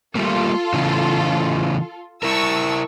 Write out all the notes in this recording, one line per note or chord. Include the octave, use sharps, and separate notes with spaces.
G3 A3 A#3 F4 A4
C#3 E3 A3
E4 A#4 A5 C#6 E6